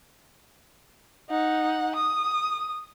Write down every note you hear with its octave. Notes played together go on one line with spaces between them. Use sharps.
D#4 F#5
D#6